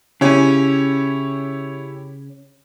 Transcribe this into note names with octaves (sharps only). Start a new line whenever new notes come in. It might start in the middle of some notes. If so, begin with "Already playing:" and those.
C#3 C#4 E4 G4 C#5